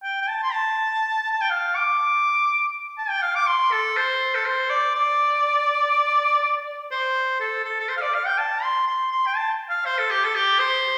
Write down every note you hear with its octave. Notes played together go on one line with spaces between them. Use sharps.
G5
G5
A5
C6
A5
A5
G5
F5
D6
A5
G5
F5
D6
C6
A4
C5
A4
C5
D5
D5
C5
A4
A4
A4
C5
F5
D5
F5
G5
A5
C6
C6
C6
G5
A5
F5
C5
A4
G4
A4
G4
C5